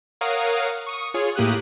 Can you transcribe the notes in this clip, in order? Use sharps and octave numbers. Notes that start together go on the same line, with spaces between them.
A#4 C#5 F5 F#5 D#6
C#6 D#6
F4 G#4 C#5
A2 A#3 G4 D#6 F#6